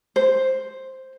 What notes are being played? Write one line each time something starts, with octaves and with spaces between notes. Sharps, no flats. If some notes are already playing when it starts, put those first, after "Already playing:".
C5